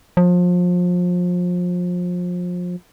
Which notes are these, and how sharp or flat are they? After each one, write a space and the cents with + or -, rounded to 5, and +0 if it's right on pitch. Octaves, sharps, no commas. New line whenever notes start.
F3 +30